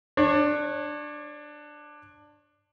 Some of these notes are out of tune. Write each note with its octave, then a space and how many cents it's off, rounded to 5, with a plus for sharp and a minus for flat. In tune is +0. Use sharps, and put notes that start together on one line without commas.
D4 +10 C#5 -25